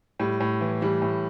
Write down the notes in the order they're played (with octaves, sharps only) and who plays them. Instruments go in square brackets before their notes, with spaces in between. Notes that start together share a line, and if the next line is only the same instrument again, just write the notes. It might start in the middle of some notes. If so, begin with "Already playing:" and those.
[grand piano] A2 G3
A2
E3
E3 G3
A2